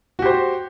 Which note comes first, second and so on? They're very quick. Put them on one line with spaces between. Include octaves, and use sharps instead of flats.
F#4 G4 C5